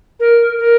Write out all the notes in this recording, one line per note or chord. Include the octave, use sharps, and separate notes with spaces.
A#4
A#4